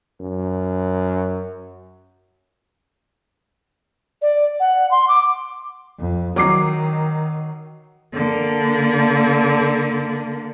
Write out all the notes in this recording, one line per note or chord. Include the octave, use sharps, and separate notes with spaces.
F#2
D5
F#5
C6
D6
F2
D#3 F#3 D6 C7
D3 A#3